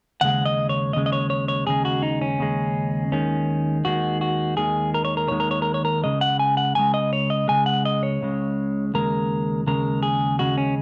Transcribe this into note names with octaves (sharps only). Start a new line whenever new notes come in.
D#2 C#3 G#3 F#5
D#5
C#5
D#2 C#3 G#3 D#5
D#5
C#5
C#5
C#5
D#2 C#3 G#3 G#4
F#4
D#4
C#4
D#2 C#3 G#3
D#2 D#3 G#3 C#4
D#2 D#3 G#3 F#4
F#4
D#2 D#3 G#3 G#4
A#4
C#5
A#4
D#2 D#3 G#3 C#5
A#4
C#5
A#4
C#5
A#4
C#2 C#3 G#3 D#5
F#5
G#5
F#5
C#2 C#3 G#3 G#5
D#5
C#5
D#5
C#2 C#3 G#3 G#5
F#5
D#5
C#5
C#2 C#3 G#3
D#2 C#3 G#3 A#4
D#2 C#3 G#3 A#4
G#4
D#2 C#3 G#3 F#4
C#4